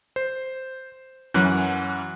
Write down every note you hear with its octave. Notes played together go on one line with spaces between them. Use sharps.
C5
F#2 E3 F#3 C#4 F#5 F#6